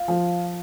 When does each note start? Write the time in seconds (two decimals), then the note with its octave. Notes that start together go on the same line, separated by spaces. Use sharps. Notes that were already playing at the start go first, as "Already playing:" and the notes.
Already playing: F4
0.08 F3